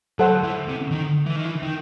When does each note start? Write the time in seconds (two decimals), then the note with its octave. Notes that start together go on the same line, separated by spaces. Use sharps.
0.19 F#3 A4 C5 F#5
0.43 E3
0.68 C3
0.91 D#3
1.26 E3
1.36 D#3
1.45 E3
1.63 D#3